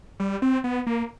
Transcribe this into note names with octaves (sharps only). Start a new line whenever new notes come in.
G3
C4
B3
A#3